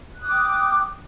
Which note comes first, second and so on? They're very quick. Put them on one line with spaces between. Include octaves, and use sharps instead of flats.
F#6 D#6 D6 G5